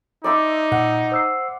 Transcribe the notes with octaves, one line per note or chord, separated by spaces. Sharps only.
D#4 D5 E5 C6
A#2 F#5
C5 E6 C7